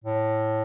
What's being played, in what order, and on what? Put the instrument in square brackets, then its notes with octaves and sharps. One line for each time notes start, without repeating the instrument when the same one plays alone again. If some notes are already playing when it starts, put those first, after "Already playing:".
[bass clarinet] A2